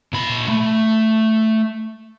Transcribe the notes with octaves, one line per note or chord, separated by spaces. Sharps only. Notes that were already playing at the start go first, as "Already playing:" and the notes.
A#2 B5
A3